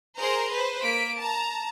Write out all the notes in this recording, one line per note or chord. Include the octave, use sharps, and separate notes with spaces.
G#4 A#4 C5 A#5 C6
B4 C5
A#3 B6 D7
A5 A#5